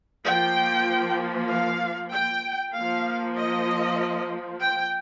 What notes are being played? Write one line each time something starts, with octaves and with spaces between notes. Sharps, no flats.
F3 A#3 G5
F5
G5
F3 A#3 F5
D#5
G5